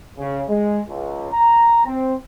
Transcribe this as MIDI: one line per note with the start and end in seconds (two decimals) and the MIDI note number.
0.18 0.43 49
0.49 0.80 56
0.89 1.28 37
1.32 1.83 82
1.85 2.14 60